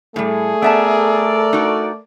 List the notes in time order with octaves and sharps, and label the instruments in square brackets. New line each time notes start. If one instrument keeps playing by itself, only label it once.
[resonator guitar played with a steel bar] A2 G3 [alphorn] A3 [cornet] G#4
[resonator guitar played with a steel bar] B3 E5 A5 [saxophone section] A4 A#4 D5
[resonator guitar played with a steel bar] D#4 F#4